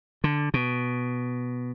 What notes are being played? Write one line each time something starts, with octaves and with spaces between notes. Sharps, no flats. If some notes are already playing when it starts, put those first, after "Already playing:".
D3
B2